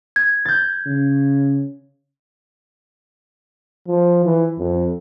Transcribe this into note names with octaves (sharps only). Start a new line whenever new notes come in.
G#6
G6 A6
C#3
F3
E3
F2